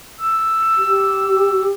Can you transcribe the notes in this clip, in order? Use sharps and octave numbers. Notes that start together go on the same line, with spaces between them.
E6
G4